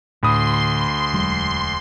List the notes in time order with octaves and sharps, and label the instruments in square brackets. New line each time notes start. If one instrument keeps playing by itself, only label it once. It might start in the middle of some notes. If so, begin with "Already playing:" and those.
[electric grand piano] D2 B5 D#6 [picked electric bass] A2 D3 [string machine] C6
[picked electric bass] E1 F#3 G#3